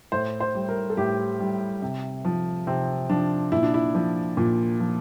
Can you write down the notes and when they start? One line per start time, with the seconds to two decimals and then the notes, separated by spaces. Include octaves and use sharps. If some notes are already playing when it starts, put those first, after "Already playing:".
0.12 A2 C5
0.40 C5
0.55 G3
0.69 A#4
0.90 A4
0.97 A2 G4
1.40 G3
1.82 C3
2.25 F3
2.67 C3 C4
3.09 F3 D4
3.52 A#2 E4
3.63 D4
3.74 E4
3.95 F3
4.37 A#2
4.80 F3